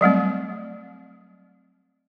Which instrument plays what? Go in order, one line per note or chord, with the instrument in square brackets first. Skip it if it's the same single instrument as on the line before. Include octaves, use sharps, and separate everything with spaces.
[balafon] F#3 G3 A3 C4